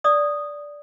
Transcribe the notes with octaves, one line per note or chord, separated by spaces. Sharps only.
D5 D#6